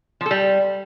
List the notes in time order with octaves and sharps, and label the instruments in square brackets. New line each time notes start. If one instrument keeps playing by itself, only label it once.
[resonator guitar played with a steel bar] F3
A4
G3